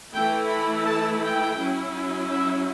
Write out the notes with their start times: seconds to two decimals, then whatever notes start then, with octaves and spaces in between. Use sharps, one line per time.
0.14 E3 A3 E4 G5
0.50 B5
0.86 A5
1.23 G5
1.59 F#3 C#4 E4
2.31 E5